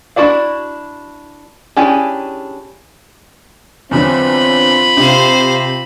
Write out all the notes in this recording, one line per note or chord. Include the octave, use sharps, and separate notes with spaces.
D4 E4 F#4 D5 F5
C#4 D4 E4 G4 G#4
E2 D3 F#3 C4 F4 B5
C3 C5 F5